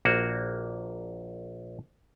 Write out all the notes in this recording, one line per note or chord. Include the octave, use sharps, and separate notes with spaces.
A#1 A#3 F#4